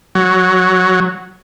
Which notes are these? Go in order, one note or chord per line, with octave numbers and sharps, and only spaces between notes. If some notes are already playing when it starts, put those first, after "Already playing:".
F#3